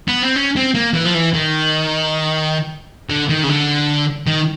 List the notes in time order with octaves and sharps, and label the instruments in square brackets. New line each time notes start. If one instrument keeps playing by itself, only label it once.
[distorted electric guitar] B3
C4
C#4
C4
A#3
E3
F3
E3
D#3
D3
D#3
C#3
D3
D#3